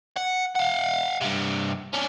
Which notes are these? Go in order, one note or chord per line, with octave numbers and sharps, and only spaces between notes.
F#5
F5 F#5
G2 C3
C#4 D4